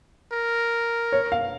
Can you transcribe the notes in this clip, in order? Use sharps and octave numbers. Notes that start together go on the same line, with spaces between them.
A#4
C#5
F5